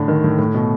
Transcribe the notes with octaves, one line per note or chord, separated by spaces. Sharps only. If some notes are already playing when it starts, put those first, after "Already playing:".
Already playing: A2 D3
D#3
A2
A2
B2